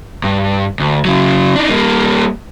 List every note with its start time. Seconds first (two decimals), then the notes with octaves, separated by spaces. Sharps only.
0.24 G2
0.80 D2
1.05 C#3 F#3
1.56 D4 D#4
1.69 G3 A#3